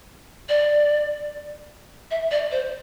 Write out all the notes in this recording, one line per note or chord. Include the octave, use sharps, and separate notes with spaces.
D5
E5
D5
C5